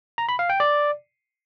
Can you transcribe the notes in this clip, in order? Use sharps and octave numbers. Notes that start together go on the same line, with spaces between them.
A#5
B5
F5
G5
D5